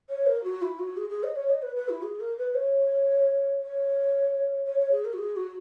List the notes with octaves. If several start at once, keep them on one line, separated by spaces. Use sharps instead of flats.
C#5
A#4
F#4
E4
F#4
G#4
G#4
D#5
C#5
D#5
B4
B4
E4
G#4
A#4
B4
C#5
C#5
C#5
C#5
G#4
A#4
F#4
G#4
F#4